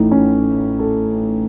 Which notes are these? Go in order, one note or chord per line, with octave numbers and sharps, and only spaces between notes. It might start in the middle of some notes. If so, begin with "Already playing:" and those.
Already playing: A1 A2 D#4
C#4
A4